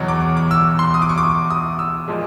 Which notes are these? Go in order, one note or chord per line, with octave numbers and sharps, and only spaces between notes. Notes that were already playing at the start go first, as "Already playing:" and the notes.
Already playing: E2 B2 F#3
D6
D6
E6
C6
D#6
D6
C#6
D6
D#6
E6
A#2 F3 G#3